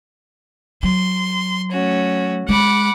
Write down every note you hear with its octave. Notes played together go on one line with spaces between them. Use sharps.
F#3 C6
A3 C#4 F#4
G#3 F#5 B5 D6